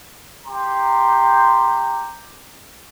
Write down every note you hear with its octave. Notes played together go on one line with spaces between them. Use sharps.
G4 A#5 C6